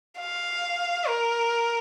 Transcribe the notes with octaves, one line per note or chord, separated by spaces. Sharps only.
F5
A#4